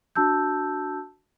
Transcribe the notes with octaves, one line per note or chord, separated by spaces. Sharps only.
D4 F#4 A5 E6 G6